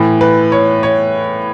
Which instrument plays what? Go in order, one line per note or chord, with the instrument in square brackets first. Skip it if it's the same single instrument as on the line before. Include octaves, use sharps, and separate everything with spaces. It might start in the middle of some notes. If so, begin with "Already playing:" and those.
Already playing: [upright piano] A2 E3
B4
C#5
C#5